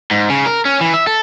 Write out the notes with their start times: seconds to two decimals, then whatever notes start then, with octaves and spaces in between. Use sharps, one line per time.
0.11 G#2
0.30 C#3
0.46 A#4
0.65 C#4
0.81 E3
0.94 E5
1.07 A4